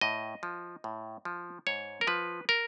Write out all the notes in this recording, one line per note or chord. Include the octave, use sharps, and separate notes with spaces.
A2 D#5
F3
A2
F3
G#2 C#5
A#4
F3 B4
A#4